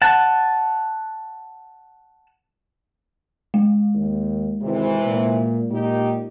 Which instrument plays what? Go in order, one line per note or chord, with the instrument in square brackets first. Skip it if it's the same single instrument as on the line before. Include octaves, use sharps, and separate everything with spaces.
[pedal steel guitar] F#5 A5
[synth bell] G#3
[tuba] D#2
[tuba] G#1 [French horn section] C3 E3
[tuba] A#2
[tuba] A#2 [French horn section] D#4 G4